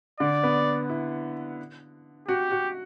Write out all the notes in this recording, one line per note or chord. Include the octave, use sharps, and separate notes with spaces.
D3 D5
B3
E4
F#4 G4
F#4